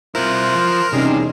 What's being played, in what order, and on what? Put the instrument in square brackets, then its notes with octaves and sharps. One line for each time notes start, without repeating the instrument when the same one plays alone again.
[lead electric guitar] C4 E4 [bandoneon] F4 C5 F#6 [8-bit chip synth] A#4
[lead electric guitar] F3
[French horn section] E2 C#4 D#4 [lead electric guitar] C3 [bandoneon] G3 G#4